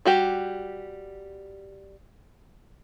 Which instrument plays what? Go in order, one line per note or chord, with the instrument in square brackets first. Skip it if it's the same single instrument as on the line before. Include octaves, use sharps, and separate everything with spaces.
[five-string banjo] G3 F#4 G4